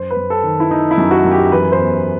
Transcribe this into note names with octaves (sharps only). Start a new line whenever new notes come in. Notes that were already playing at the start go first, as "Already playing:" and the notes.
Already playing: F#2 C5
B4
F#2
A4
D#3
E4
D#3 D#4
E4
F#2
F#4
F#2
G4
E3 B4
C5
E2